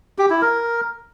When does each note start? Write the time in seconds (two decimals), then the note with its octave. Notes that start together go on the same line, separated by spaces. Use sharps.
0.19 G4
0.30 E4
0.42 A#4